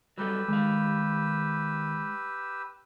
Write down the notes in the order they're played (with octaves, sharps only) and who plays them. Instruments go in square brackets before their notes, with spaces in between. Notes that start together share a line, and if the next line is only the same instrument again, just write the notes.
[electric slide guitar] F#3 G3 A4 [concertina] G4 B4 E6
[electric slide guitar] D#3 F5 [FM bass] G#3